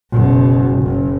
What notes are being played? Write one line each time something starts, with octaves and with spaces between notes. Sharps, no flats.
F#1 B2
F#1